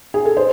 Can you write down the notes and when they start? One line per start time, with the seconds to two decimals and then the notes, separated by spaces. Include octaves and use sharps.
0.14 G#4
0.25 A4
0.37 C5